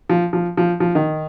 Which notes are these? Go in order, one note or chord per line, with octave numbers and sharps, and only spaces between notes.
F3
F3
F3
F3
D#3